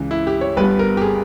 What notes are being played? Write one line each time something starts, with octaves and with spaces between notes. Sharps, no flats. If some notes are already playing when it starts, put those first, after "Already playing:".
Already playing: C#2 C#3 E3
E4
G4
C#5
G1 G2 G3 B3 B4
A#4
G4
G#4